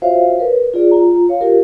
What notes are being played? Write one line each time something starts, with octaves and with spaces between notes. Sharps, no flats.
F4 F#4 C5 C#5 E5 F5
A#4 B4 C#5
F4 G#4 D5
F4 A#5
C#5 F5
F4 G4 A#4